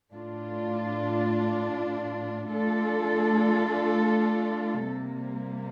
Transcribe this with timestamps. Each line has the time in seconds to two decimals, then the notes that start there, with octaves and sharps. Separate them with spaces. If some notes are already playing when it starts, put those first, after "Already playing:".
0.13 A2 A3 D4 F4
2.50 A3 D4 F4 A4
4.87 C3 G3 A#3